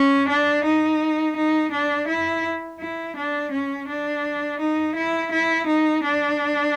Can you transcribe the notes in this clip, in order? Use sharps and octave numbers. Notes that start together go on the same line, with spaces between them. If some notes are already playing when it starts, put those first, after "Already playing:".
Already playing: C#4
D4
D#4
D#4
D4
E4
E4
D4
C#4
D4
D#4
E4
E4
D#4
D4